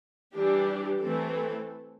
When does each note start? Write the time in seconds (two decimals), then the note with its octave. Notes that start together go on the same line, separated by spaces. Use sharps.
0.35 E3 G3 D4 G4
1.00 E3 A3 C4 A4